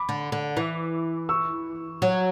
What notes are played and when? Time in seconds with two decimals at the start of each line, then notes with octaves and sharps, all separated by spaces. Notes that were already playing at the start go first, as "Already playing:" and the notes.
Already playing: B5 D6
0.09 D3
0.32 D3
0.57 E3
1.29 C#6 E6
2.02 F#3